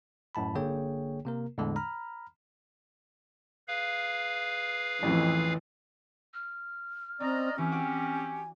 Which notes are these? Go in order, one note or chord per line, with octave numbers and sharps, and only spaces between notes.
F#2 A2 A5 B5
G1 D3 A#3 G#4 C#5 G5
C3 A#3 A#4
E2 A2 D3 G#3 D4
A#5 B5 F6
G#4 B4 F5
A1 F2 E3
F6
C4 C#4 D5 D#5 A#5
E3 C4 C#4 G4 G#5
F#4 D5